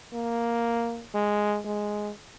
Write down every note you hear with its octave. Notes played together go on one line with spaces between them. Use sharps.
A#3
G#3
G#3